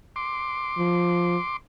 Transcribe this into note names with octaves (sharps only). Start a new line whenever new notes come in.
C6 D6
F3